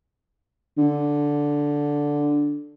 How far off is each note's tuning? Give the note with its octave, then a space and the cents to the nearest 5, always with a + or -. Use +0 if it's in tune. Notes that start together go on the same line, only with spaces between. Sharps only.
D3 -5